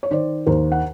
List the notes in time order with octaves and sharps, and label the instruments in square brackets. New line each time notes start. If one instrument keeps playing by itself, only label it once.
[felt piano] C#5
D#3 C5 D5
D#2 A#4 C5
F#5